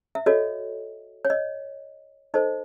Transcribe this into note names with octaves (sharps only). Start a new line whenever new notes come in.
E5
F#4 A4 C#5 D#5
C#5
D#5
D#4 A4 C5 D#5